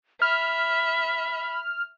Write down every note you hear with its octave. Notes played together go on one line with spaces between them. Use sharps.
E5 B5 F6